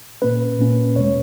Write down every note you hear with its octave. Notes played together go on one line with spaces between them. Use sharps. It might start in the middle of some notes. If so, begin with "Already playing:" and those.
A#2 A#3 C#4 B4
A#2 A#3 C#4
E2 B2 G#3 C#5